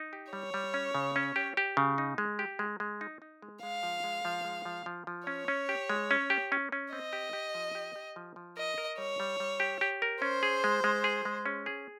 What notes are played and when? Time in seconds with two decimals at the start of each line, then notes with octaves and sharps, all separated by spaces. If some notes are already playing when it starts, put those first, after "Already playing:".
Already playing: D#4
0.13 G4
0.33 G3 C#5
0.54 G3
0.74 C#4
0.95 C#3
1.16 C#4
1.36 G4
1.57 G4
1.77 C#3
1.98 D#4
2.18 G#3
2.39 G4
2.59 G#3
2.80 G#3
3.01 D#4
3.22 D#4
3.42 G#3
3.63 G#3 F5
3.83 F3
4.04 G#3
4.25 F3
4.45 G#3
4.65 F3
4.86 F3
5.07 F3
5.27 C#4 C#5
5.48 C#4
5.69 G4
5.90 G#3
6.11 C#4
6.30 G4
6.52 C#4
6.72 C#4
6.92 C4 D#5
7.13 G4
7.33 G4
7.55 F3
7.75 G4
7.96 G4
8.16 F3
8.36 F3
8.57 A#4 D#5
8.78 A#4
8.98 G3 C#5
9.20 G3
9.40 G3
9.60 G4
9.81 G4
10.02 A#4
10.22 C#4 C5
10.43 G#4
10.64 G#3
10.84 G#3
11.04 G#4
11.25 G#3
11.46 C#4
11.66 G#4